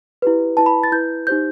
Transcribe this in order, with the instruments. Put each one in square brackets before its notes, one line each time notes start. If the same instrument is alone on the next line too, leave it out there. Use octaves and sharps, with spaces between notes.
[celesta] E4 G4 B4
E4 B4 A5
B5
A6
E4 B4 G6
D#4 G4 C5 G6